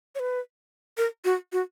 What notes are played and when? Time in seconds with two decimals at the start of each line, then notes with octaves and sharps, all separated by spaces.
0.15 C#5
0.20 B4
0.98 A#4
1.25 F#4
1.53 F#4